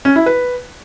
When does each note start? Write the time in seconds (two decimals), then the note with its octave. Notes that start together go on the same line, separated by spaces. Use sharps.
0.05 C#4
0.16 E4
0.26 B4